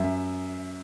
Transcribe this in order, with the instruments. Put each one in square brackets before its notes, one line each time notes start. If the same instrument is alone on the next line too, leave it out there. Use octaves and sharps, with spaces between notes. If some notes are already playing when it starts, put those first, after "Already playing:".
Already playing: [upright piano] F#2 E5